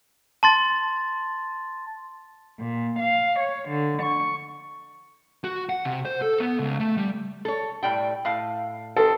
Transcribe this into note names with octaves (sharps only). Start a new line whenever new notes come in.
A5 C6 A6
A#2
F5
C#5
D3
C#6
F#4
F#5
C3
C5
A4
B3
C#2
A3
G3
A4 C#5
A2 G3 G5
A2 F5
D#3 C4 A4